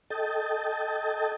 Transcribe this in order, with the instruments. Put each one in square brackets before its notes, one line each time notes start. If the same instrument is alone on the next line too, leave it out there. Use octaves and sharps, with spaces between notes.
[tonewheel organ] A4 D#5 G5 A5